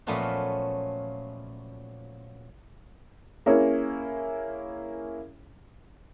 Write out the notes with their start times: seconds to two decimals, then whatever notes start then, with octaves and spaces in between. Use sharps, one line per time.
0.07 A#2 F3 F#3 A3 B3 C#4
3.46 A#3 C#4 E4 G#4 C#5